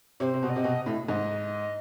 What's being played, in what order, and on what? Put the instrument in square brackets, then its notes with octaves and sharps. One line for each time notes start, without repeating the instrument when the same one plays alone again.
[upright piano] C3 [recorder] C#5
[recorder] C5
[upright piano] C3
B2
[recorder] D#5
[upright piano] C3
B2
A2
[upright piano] G#2 [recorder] D#5